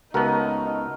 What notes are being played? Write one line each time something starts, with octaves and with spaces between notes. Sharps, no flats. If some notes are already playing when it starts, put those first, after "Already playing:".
C#2 A3 B3 D#4 F#4 A#4